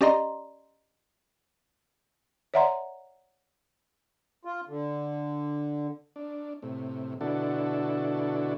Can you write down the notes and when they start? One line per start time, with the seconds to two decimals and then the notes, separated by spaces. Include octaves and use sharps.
0.01 C#4 G4 D5 D#5 A#5 C6
2.54 C#5 D5 E5 F#5 A#5 C6
4.45 F4
4.68 D3
6.16 D4
6.62 A2 C3
7.21 B2 D3 D4 E4 F#4 A4